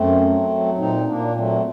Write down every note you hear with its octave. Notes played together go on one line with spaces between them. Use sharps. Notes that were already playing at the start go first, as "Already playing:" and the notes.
Already playing: F#2 A3 C4
F#3
F#3
A#2 C4 D#4
A#2 A#3 D4
F#3 A3 C4